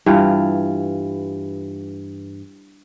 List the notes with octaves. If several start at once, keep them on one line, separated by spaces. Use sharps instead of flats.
G2 E3 F4